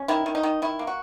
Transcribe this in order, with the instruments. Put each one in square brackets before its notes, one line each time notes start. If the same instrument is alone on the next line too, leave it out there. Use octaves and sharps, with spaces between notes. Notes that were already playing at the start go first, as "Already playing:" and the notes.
Already playing: [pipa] C#4
D#3 E4
D#3
D#4
D#3
D#3 E4
A#3
F#4